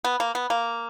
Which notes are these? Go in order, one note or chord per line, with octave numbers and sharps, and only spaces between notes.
B3
A#3
B3
A#3